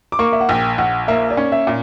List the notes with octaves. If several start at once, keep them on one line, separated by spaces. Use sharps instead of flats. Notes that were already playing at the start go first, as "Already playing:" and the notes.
D6
A#3 C#6
E5
F#5
A#1 G5
A#1 F#5
A#3 E5
D5
C#4
E5
A#2